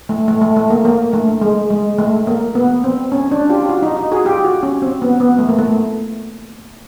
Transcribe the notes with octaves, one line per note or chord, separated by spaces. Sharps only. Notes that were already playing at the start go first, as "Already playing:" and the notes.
A3
A3
A3
A3
A#3
A#3
A3
G#3
G#3
A3
A#3
B3
C4
C#4
D4
F4 G4
F4
F#4
D#4
D#4
F#4 G#4
F4 G4
F#4
C#4
C4
B3
B3
A3
A#3
A3